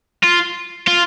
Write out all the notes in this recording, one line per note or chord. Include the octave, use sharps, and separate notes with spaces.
F4
F4